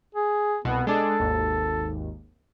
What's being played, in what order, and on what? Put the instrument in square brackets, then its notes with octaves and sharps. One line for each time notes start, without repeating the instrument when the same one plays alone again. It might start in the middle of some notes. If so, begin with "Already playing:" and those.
[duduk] G#4
[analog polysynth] C2 B2 [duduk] B3
[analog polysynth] G#3 D4 [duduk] A4
[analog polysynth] G#1 D#2